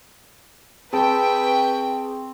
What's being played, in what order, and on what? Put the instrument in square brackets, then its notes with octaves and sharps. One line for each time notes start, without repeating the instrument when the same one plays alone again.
[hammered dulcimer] C4 [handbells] G#4 A5 D7 [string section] B4 G5 C#6